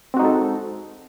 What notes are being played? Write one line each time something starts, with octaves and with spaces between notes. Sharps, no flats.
G#3 C4 D#4 F#4 A4